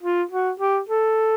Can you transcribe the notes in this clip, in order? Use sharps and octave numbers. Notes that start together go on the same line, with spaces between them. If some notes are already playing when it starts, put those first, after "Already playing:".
F4
F#4
G4
A4